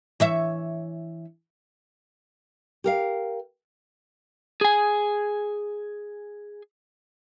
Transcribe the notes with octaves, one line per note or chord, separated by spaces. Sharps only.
E3 C#5 E5
G4 A#4 F5
G#4 G#5